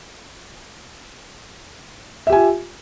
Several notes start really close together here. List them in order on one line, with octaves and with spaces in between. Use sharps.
E5 G4 G#5 F4